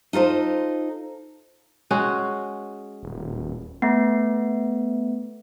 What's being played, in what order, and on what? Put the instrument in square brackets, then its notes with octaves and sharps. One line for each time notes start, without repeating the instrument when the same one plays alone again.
[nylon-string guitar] D#4 F4 A4 C5
[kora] G#3 C#4 F#4
[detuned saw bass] D#1
[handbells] A3 B3